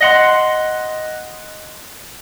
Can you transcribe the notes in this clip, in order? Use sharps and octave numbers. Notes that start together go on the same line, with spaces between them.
D#5 F#5 C6